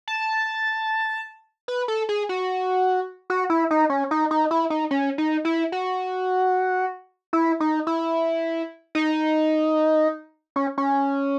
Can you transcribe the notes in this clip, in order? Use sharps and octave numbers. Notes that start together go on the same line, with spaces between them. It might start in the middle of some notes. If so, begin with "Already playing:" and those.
A5
B4
A4
G#4
F#4
F#4
E4
D#4
C#4
D#4
D#4
E4
D#4
C#4
D#4
E4
F#4
E4
D#4
E4
D#4
C#4
C#4